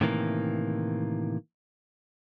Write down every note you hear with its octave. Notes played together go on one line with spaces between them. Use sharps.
A2 C3 D#3 E3 A#3